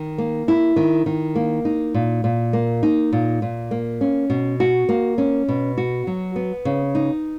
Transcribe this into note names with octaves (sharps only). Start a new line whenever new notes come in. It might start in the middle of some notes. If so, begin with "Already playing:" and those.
Already playing: D#3
A#3
E4
D#3
D#3
A#3
D#4
A#2
A#2
A#3
D#4
A#2
A#2
A#3
C#4
B2
F#4
A#3
C#4
B2
F#4
F#3
B3
C#3
D#4